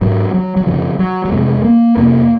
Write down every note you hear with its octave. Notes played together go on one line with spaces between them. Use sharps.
G#2 F#3
F#3
F#3
F#2 C#3 F3
F#3
F#3
F2 C3 G#3
A#3
F2 C3 A#3